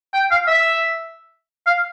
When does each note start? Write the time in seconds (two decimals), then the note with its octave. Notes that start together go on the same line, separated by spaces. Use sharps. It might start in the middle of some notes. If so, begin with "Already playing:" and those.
0.14 G5
0.31 F5
0.47 E5
1.66 F5